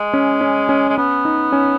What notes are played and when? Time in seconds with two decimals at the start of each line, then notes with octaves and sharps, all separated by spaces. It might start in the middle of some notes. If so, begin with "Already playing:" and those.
Already playing: G#3
0.13 C#4
0.41 C#4
0.69 C#4
0.89 G#3
0.97 B3 C#4
1.25 D#4
1.52 C#4